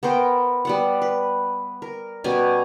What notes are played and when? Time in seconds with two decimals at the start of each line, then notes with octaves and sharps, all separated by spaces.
0.03 B3 A#4 C5 G5
0.65 G3 B3 F#5
1.02 B4
1.82 A#4
2.24 B2 G3 C#4 G#5